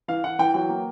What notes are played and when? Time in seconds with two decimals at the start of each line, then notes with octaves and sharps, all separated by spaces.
0.08 E3 F5
0.24 E3 F#5
0.39 E3 G5
0.54 F#3 G5
0.69 A#3